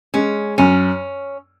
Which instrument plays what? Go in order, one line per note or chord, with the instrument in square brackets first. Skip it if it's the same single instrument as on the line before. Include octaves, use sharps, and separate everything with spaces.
[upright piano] G#3 [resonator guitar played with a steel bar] C#4
[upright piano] F#2 [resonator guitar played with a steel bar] C#4